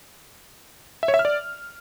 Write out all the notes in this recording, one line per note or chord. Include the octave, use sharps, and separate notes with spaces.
E5
C#5
E5
F6
D5